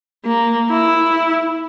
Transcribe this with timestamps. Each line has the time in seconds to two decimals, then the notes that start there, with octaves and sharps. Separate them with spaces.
0.26 A#3
0.71 E4